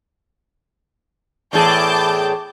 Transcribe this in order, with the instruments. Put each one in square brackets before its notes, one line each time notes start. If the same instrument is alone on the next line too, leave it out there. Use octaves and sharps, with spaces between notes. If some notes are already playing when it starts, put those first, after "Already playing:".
[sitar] E2 A2 G#4 [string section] A5 D6 G6